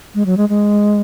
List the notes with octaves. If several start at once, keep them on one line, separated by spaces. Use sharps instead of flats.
G#3
F#3
G#3
G#3